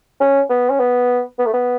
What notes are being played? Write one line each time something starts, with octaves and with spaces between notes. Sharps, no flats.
C#4
B3
C#4
B3
B3
A3
B3